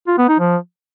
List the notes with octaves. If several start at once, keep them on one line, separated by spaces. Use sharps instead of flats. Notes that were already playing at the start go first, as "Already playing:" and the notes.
F4
B3
D#4
F3